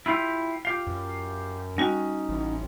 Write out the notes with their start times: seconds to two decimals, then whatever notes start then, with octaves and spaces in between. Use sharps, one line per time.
0.06 E4 F4 G4
0.65 F4 G4 F5
0.87 F#2
1.78 G3 C#4 D#4 F#4
2.29 A1